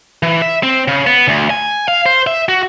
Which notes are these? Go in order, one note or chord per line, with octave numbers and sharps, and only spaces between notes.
E3
E5
C4
C#3
B3
D2
G#5
F5
C5
E5
F#4